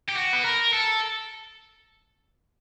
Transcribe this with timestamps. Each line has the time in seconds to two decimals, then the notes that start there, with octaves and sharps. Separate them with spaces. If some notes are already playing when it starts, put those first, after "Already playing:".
0.09 G4
0.16 F#4
0.33 B4
0.45 A#4
0.73 A4